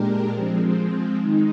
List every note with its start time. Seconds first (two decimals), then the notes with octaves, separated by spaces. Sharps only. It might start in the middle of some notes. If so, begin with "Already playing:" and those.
Already playing: A#2 G#3 D4 G4 A#4
0.32 F3 G#3 C4
1.18 D#3 G#3 D#4